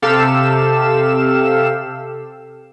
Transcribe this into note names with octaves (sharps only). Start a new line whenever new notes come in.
C3 G4 A4 F5 E6 E7